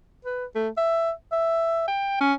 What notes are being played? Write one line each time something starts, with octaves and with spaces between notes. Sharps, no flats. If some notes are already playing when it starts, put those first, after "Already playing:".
B4
A3
E5
E5
G5
C#4